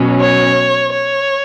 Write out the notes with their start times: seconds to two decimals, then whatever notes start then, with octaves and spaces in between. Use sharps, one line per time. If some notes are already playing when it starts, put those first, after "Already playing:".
Already playing: B2 F#3 C#4
0.20 C#5
0.93 C#5